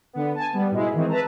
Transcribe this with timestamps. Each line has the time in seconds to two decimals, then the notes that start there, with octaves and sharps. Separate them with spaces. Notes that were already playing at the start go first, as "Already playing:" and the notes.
0.13 D3 B3
0.35 G#5 A5
0.53 G3 B3
0.71 G#2 B2 G#3 E4
0.94 D#3 E3 G#3 C4
1.09 B4 E5 A5 A#5